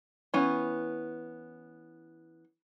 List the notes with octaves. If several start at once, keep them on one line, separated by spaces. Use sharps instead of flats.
E3 B3 C#4